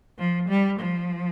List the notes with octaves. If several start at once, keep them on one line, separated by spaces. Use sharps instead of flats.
F3
G3
F3